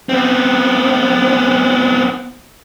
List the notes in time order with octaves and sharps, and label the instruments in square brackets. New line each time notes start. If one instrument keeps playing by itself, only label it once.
[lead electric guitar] B3 C4